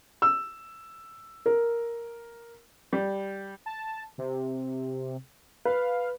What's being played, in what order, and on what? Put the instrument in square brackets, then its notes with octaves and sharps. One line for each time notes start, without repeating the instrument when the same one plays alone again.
[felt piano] E6
A#4
[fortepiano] G3
[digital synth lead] A5
C3
[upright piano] B4 [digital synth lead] F5